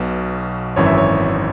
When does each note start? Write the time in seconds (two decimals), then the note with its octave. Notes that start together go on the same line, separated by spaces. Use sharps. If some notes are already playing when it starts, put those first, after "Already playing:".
Already playing: B1 B2
0.76 G#1 F#2 E3 C#5
0.86 E5
0.98 C#5